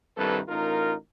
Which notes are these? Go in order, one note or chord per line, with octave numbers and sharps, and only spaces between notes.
C2 G2 C3 D#3 A4 B4
A1 D#4 F4 A#4